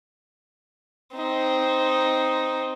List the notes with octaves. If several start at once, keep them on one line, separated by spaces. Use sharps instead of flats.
C4 D#4